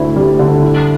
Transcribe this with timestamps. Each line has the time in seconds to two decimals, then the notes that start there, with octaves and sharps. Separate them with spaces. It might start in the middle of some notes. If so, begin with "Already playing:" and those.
Already playing: D2 D3 E4
0.16 G3
0.39 D3
0.62 E4